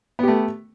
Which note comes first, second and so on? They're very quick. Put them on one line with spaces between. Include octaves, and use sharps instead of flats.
B3 G4 A3